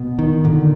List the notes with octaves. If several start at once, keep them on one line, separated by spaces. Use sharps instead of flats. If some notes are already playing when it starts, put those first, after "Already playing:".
Already playing: B2
D#3
A#2 D3